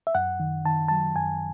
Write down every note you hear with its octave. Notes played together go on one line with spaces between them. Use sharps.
E5
F#2 F#5
D#3
D#3 A5
F#3 A5
F#2 G#5